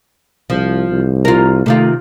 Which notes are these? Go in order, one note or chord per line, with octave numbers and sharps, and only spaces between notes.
C2 F3
C2
F4 A#4
C3 D#3 A3 F4